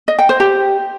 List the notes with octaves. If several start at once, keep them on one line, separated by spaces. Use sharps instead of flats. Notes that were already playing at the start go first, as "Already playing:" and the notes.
D#5
G5
C5
G4